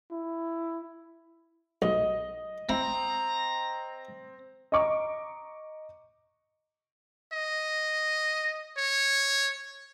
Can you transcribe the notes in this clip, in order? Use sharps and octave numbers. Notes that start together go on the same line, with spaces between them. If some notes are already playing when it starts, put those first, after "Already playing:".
E4
B1 D#5
C4 E4 A#5
D#5 A#5 C#6 D6
D#5
C#5